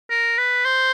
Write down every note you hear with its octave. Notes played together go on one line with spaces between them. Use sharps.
A#4
B4
C5